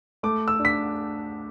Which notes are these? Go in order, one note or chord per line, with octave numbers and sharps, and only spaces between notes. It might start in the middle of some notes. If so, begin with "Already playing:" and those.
A3 D6
E6
D4
B6